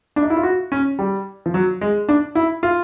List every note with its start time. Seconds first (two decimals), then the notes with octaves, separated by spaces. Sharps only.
0.16 D4
0.23 D#4
0.30 E4
0.36 F4
0.43 F#4
0.72 C#4
0.99 G3
1.46 F3
1.54 F#3
1.81 G#3
2.09 D4
2.35 E4
2.63 F4